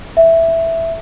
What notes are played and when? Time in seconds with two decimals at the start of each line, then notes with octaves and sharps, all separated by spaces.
0.17 E5